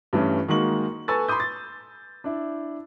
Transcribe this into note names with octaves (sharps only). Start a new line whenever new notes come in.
G2 E3 A3 C#4
D#3 G#3 A#3 F#4 C#6 F#7
A4 B4 G#5 C#6 E6 A6
B5 C6 D6 D#6 G6
A6
D4 E4